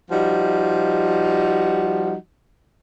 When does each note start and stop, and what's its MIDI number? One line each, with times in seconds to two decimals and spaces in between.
0.11 2.14 53
0.11 2.14 55
0.11 2.14 63
0.11 2.14 66